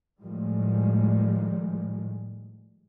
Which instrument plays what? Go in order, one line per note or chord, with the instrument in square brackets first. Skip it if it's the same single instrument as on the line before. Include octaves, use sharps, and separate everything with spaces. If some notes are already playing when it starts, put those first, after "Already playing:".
[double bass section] A2 D#3 F3 G3 G#3